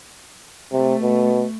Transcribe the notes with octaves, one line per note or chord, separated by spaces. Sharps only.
C3 A3
B2